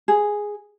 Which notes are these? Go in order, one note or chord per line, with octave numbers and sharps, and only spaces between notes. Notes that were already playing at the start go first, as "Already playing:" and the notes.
G#4